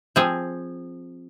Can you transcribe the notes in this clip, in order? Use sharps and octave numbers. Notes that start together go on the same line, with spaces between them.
F3 C4 G#4